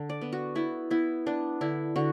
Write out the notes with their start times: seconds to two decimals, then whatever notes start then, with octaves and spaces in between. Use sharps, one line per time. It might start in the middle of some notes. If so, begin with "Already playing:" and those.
Already playing: D3
0.09 D5
0.21 B3
0.33 F#4
0.55 B3 E4
0.90 B3 E4
1.26 B3 D4
1.61 D3 E4
1.96 D3 F#4